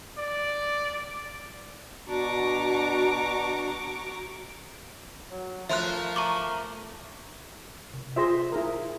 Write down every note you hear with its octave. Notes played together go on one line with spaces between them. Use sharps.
D5
B2 D4 F#4 A#5 C#6 D6
F#3
F3 A3 A#4 E5 C6 F#6
A#5 C#6 D6
C3
F4 G#4 C5 E5 C6 A#6
E4 G#4 A#4